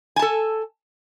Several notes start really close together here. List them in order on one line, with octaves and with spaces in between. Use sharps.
G#5 A5 A4